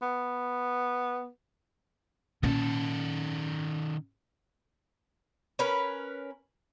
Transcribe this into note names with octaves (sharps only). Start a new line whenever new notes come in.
B3
A#2 D#3 C#4 A4
C#4 A#4 B4